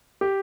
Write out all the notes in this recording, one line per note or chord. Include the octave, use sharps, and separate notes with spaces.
G4